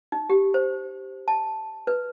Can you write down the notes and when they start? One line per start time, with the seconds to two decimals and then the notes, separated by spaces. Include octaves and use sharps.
0.12 D#4
0.29 G4
0.54 C5
1.28 A5
1.87 B4